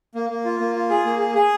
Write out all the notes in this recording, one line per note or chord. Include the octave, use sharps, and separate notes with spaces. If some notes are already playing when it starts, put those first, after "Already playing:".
A#3
A#3
F4
A#3
F4
G#4
A#3
G#4
G#4